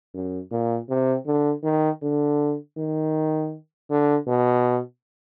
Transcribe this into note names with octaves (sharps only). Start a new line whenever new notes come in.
F#2
A#2
C3
D3
D#3
D3
D#3
D3
B2